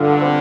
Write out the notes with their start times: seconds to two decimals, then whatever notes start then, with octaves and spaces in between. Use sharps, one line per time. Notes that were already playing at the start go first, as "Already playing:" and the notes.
Already playing: G2 D3 F4
0.21 C4